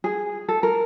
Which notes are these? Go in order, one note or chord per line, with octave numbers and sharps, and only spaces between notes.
G#4
A4
A#4